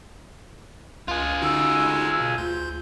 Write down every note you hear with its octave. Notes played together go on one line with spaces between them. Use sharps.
C#2 F4 G#4
D3 D#4 F#4 E6
B2
D2 F4 C6 G6